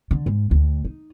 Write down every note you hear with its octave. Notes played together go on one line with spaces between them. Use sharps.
D3
G#2
D2
D#4